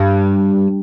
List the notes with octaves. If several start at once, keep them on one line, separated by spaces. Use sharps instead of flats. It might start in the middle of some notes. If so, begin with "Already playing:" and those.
Already playing: G2